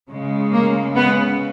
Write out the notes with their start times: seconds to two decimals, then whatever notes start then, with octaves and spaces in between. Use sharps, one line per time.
0.11 C#3 G#3
0.52 A#3
0.94 G#3 B3